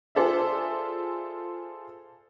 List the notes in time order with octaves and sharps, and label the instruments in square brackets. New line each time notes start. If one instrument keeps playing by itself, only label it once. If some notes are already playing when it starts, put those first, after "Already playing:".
[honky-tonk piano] F4 G#4 A4 C5 D5 E5